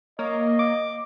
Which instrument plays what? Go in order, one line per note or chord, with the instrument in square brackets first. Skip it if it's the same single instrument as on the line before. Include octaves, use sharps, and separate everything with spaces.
[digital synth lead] A#3 [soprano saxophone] C#5 [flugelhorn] D#5
[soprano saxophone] D6